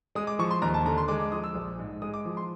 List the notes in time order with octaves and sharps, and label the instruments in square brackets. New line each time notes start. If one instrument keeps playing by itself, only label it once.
[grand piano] G#3 D#6
D6
F3 C#6
C6
D#2 A#5
A5
D3 A#5
C6
G#3 D6
D6
F3 D#6
E6
A#1
G#2
G#3 D#6
D6
F3
C6